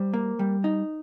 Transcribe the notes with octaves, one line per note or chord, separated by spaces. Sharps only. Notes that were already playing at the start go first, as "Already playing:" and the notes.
Already playing: G3 C5
A#3
G3
D#4